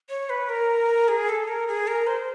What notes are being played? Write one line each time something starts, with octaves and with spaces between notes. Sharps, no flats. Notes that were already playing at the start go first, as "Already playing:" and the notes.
C#5
B4
A#4
G#4
A4
A#4
G#4
A#4
C5